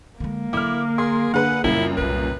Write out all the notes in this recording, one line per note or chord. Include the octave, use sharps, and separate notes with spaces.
D3 G#3 A#3
D3 F#3 E4 D6 F6
G#4 C6
D3 G#4 B4 F#5
C#2 F#2 A#2 G3 C4 E4
C2 G3 B4